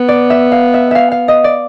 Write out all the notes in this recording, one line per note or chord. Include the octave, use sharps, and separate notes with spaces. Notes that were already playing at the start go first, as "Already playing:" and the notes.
Already playing: B3
D5
E5
F5
E5
E5 F5
F5
D#5
D5